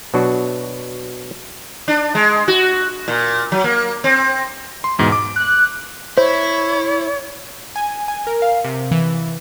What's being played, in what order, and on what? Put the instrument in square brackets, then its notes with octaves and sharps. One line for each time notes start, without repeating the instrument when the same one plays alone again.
[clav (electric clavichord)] B2 F#3 D4 F#4
[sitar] D4
G#3
F#4
A#2
F#3
A#3
C4
[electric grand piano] C6
E2 G#2 B2
D6
[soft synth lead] F#6
[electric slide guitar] E4 [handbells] C5 [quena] C#5
[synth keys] G#5
G#5
A#4
F5
C3
E3